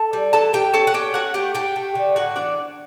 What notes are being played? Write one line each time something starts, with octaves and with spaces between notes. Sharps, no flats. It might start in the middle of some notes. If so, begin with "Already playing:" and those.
Already playing: A4 A5
G3
E3 A4 A5
E3 G4 G5
C#4 A4 A5
F#5
C#4 G4 G5
A3 F#4 F#5
A3 G4 G5
A3 G4 G5
A3
D3
A2 F#4 F#5
E3 D4 D5